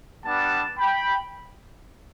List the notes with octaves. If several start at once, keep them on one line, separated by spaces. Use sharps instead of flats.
G3 B3 D4 F#5 A5
G5 B5